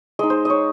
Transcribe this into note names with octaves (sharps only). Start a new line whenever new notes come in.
G#3 D#4 D#5
C5
C#5 D#5